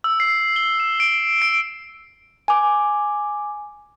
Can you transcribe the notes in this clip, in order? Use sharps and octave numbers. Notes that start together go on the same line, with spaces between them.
E6
C7
G7
E7
D7
D7
G#5 D6